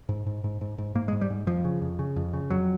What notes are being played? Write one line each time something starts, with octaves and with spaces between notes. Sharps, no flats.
G#2
G#2
G#2
G#2
G#2
G#2 A#3
G#3
G#2
G3
G#2
F2 F3
C#3
F2
C#3
F2
C#3
F2 F#3